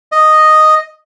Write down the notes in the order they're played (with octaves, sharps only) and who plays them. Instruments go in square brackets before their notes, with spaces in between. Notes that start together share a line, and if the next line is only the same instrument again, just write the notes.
[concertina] D#5